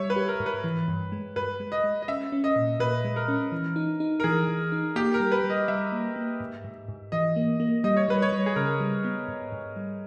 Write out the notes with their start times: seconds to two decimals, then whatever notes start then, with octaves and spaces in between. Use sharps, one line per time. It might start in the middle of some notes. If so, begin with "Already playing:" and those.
Already playing: G3 C#5 E5
0.10 B4
0.16 G4
0.28 A#4
0.40 G#2
0.46 B4
0.64 E3
0.88 G2
1.12 G#3
1.36 G2 B4
1.60 G#3
1.72 D#5
1.84 G#3
2.02 D#5
2.08 C#4 E5
2.32 C#4
2.44 D#5
2.56 A#2
2.80 A#2 B4
3.05 G#3
3.16 A#4
3.28 C#4
3.52 E3
3.76 D#4
4.00 D#4
4.20 A#4
4.24 E3 G#4
4.48 E3
4.72 D#4
4.96 A#3 G4
5.14 A#4
5.20 G3
5.32 B4
5.44 G3
5.50 D#5
5.68 G3 E5
5.92 A#3
6.16 A#3
6.40 G#2
6.65 G#2
6.88 G#2
7.12 E3 D#5
7.36 A#3
7.60 A#3
7.84 G3 D#5
7.97 C#5
8.08 G3 B4
8.22 C#5
8.32 G3
8.46 G#4
8.56 C#3 A#4
8.80 G3
9.05 B3
9.28 G#2
9.52 G#2
9.76 G3